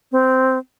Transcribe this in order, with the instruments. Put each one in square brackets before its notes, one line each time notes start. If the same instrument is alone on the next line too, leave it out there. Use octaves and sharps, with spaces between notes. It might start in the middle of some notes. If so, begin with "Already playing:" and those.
[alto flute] C4